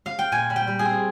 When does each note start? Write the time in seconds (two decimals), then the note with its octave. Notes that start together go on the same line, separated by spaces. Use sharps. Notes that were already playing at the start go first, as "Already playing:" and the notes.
0.06 F5
0.19 G5
0.32 A#2 G#5
0.50 G3
0.56 G5
0.67 G3
0.79 G#4
0.85 C4